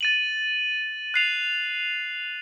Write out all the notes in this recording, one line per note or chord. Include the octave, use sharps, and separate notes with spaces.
A6 D#7 F#7
F#6 C7 F7